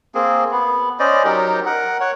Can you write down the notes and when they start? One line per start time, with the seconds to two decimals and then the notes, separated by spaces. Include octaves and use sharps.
0.15 A#3 C4 G#4
0.51 B3
1.00 C#4 C5 D5 D#5
1.25 F#3 D#4 G4 A#4
1.66 A#4 F#5
2.01 C#5 F#5